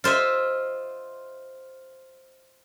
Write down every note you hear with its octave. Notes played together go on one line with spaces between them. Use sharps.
F4 C5 D#5 E5